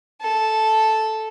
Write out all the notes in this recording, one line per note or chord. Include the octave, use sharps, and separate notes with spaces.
A4